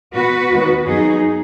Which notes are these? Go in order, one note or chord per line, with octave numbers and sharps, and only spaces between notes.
B2 B3 F#4 B4
D#2 D#3 G#3 B3
F#2 F#3 B3 D#4 G#4